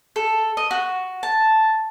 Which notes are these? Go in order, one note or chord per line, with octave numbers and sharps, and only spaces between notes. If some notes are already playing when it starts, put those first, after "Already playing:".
A4
D#5
F#4
A5